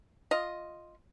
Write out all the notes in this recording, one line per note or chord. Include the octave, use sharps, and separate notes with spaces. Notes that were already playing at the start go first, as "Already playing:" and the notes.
F4 D#5